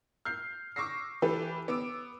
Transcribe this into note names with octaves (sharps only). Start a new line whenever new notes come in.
F6 G6 C7
C#6 D6 E6 A#6 C7
E3 G4 A4 B4
B3 D6 E6 D7